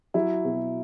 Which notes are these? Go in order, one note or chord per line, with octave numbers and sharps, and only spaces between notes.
F#3 E4
B2